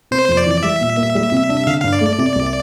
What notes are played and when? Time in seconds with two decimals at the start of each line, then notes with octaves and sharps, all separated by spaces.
0.11 C3 C5
0.29 F2
0.37 D5
0.46 E3
0.63 G3 E5
0.81 A#2
0.97 A#3
1.15 G3
1.32 C3
1.49 D4
1.67 D3 F5
1.81 G2 F5
1.93 D5
2.01 A3
2.18 C3
2.35 C2